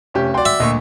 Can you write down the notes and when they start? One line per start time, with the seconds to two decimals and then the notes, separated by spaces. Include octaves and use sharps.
0.14 F1 C#4 G4
0.34 F#4 D5 G5 C6
0.45 E5
0.60 D2 A#2 D#5 C#6